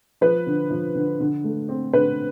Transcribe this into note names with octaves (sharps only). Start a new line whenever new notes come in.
F3 B4
D3
F3
D3
D3
A3
C4
D3 B4